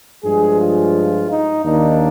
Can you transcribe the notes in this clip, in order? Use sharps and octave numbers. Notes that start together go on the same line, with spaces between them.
G2 F3 G#3 G#4
F4
D#4
D#2 D#3 A#3 D4 D#4